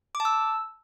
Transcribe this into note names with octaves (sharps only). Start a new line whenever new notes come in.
D6
A5
E6